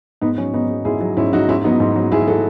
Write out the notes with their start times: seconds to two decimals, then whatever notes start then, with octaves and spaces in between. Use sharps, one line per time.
0.21 G#2 B3 D#4
0.38 F#3 C#4
0.54 G#2 B3 D#4
0.70 F#3
0.85 G#2 E4 G#4
1.01 F#3
1.17 G#2 C#4 E4
1.33 F#3 D#4 F#4
1.48 G#2 C#4 E4
1.64 F#3 B3 D#4
1.80 G#2
1.96 F#3
2.12 G#2 E4 G#4
2.28 F#3 F#4 A4